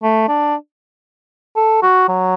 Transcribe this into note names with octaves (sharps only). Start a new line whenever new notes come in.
A3
D4
A4
F#4
F#3